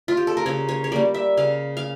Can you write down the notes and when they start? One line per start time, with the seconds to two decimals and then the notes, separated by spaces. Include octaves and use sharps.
0.08 F4
0.17 G4
0.27 A4
0.37 A#4
0.46 C#3 C#5
0.69 C#5
0.84 C#5
0.92 G3 A#3 D5
1.14 E5
1.37 C#3 F5
1.77 F5